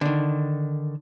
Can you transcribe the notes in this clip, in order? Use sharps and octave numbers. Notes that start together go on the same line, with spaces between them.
D3 D#3